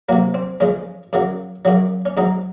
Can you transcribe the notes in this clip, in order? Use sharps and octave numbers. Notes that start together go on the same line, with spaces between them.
C3 F#3 A#3
C4
F2 C#3 G#3 C#4
F#2 C#3 F#3
F#2 C#3 F#3
C#4
G#2 F#3 D#4